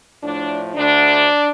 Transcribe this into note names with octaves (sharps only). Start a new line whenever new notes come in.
A2 F3 A3 D4
D2 D3 A3 D4